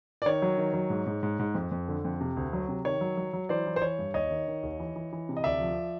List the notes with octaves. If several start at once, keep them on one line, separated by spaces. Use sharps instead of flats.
D5
D#3 C#5
F#3
D#3
F#3
G#2
G#2
G#2
G#2
F2
F2
D3
F2
C3
D2
F#3
C3
D#3 C#5
F#3
F#3
F#3
E3 C5 D5
E3
C5
E3 C#5
G2
D#2 C#5 D#5
D#3
D#3
D#2
E3
E3
E3
C3
D#5
D2 D5 E5
F3